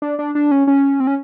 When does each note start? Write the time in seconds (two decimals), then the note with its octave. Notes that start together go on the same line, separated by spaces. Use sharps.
0.02 D4
0.19 D4
0.35 D4
0.51 C#4
0.67 C#4
1.00 C4
1.07 C#4